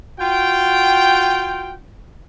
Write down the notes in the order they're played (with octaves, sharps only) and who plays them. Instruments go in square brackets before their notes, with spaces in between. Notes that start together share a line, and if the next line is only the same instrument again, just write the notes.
[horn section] F4 F#4 G5